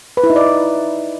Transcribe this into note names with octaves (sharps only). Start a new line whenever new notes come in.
B4
E4
D#4
D5